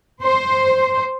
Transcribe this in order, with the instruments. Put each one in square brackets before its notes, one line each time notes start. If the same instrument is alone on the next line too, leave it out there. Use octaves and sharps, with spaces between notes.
[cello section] C5